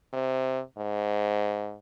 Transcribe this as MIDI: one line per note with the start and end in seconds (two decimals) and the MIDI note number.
0.13 0.60 48
0.78 1.75 44